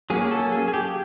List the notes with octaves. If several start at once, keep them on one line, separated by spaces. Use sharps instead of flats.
F#3 A#3 C#4 G#4
A4
G#4
G#4
G4